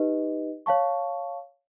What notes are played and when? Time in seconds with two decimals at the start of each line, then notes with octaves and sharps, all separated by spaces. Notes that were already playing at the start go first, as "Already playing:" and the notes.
Already playing: D#4 G4 B4 D#5
0.66 C#5 F5 A5 C#6